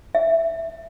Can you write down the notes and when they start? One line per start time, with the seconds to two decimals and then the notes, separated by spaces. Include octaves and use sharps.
0.15 E5